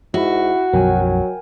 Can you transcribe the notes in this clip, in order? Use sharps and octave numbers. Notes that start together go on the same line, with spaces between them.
G#2 E4 F#4 E5
B1 F#2 F3 F#3 A#4 G5 G#5